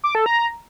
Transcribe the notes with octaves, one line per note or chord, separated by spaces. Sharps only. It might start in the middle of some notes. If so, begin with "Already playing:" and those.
D6
A4
A#5